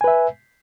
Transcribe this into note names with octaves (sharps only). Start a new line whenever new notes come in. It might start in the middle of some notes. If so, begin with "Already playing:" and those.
B4 E5 G#5